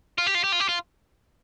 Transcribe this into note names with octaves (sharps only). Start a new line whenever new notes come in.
F4
G4
F4
G4
F4
G4
F4